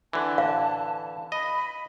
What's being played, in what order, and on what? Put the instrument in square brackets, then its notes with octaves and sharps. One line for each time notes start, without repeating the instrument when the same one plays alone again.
[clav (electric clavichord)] D3 E3 [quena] A5
[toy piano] F5
[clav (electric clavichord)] D#5 [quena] B5